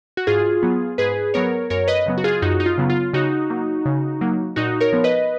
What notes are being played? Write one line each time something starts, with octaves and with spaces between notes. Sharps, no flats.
F#4
G#2 F4 G#4
F#3 B3
G#2 G#4 B4
F#3 B3 A#4 C#5
F#2 A#4 C#5
B4 D#5
C#3 F#3 B3
F#4
F4 G#4
F#2 D#4 F#4
D#4
F4
C#3 F#3 B3
F4
C#3 D#4 F#4
F#3 A#3
C#3
F#3 A#3
A#2 D#4 F#4
A#4 C#5
F3 B3
B4 D#5